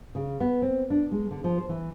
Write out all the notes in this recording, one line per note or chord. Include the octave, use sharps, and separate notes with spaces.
C#3
B3
C4
D4
G#3
D3
F3
C5
E3